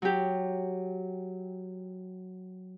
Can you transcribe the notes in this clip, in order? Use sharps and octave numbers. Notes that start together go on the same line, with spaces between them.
F#3 G4